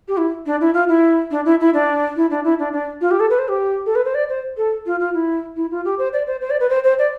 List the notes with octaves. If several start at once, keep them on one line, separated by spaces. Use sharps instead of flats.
G4
E4
D4
E4
F4
E4
D4
E4
E4
D4
E4
D4
E4
D4
D4
F4
G4
A4
B4
C5
G4
A4
B4
C5
D5
C5
A4
F4
F4
E4
E4
F4
G4
C5
D5
C5
C5
D5
B4
C5
C5
D5